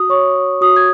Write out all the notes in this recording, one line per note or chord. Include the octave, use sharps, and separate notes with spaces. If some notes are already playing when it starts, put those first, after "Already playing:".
Already playing: F#4 D#6
C#5 C#6
C#5
F#4 D#6
G#6